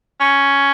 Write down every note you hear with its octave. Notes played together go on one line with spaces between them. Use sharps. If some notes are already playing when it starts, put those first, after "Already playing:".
C#4